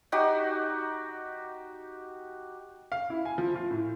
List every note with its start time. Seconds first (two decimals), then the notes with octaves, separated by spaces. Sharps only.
0.12 D#4 F#4 G4
2.92 F5
3.10 E4
3.25 G#5
3.38 F3
3.55 F4
3.71 A2